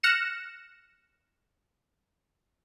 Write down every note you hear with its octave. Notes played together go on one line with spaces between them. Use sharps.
F6 F#6 A#6 C#7 E7